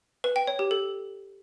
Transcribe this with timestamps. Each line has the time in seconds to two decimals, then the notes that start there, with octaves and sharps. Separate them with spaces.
0.24 B4
0.36 G5
0.47 C#5
0.59 G4
0.71 A4